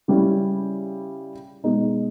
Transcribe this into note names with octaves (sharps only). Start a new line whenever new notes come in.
C#3 G3 C#4 E4
B2 G#3 D#4